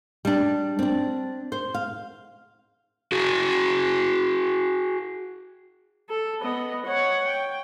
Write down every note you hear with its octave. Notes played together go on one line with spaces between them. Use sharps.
G3 D4
C4 D4
C5
F5
F#4 G#4
A4
B3 D#5
C#5 F#5
G5